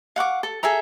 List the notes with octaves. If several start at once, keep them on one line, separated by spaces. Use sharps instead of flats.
F5 F#5 C#6 D6
A4
G#4 A4 E5 A#5